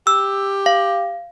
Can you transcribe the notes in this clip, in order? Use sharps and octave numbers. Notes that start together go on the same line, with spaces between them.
G4 E6
F5